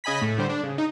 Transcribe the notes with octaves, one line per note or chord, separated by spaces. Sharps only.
C#3 D#5 G#5 B5 B6
A2 A3
D3 G3 C5
D4
C#3
D#4